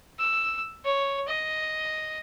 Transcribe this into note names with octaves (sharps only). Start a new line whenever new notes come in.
E6
C#5
D#5